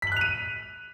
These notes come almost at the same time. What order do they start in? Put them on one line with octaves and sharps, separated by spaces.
B6 F#7 F#6 F7 D#7